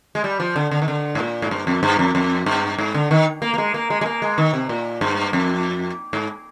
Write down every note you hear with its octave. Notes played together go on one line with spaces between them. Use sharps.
G#3
G3
F3
D3
D3
D#3
D3
G#2
A#2
G#2
G2
F2
G2
F2
F2
G2
G#2
D3
D#3
A#3
A#3
G#3
A#3
G#3
G#3
A#3
G#3
D#3
C3
A#2
G2
F2
G#2